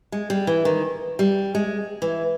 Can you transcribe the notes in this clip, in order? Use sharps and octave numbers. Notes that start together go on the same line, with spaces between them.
G#3
G3
E3
D#3
G3
G#3
E3